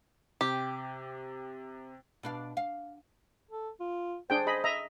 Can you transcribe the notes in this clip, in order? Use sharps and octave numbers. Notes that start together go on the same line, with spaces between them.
C3 G4
B2 D4 F5
F5
A4
F4
D4 G#4 C5 G5
G#4 D#5 B5
D#5 E5 A#5